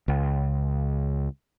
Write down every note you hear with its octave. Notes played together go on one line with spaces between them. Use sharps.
C#2